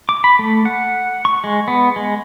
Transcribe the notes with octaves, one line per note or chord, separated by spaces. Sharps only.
D6
B5
A3
F#5
C#6
G#3
B3
G#3